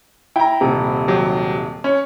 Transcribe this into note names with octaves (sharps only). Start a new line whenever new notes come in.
E4 G5 A#5
D#1 C3
D#3 F#3 G4
C#4 C#5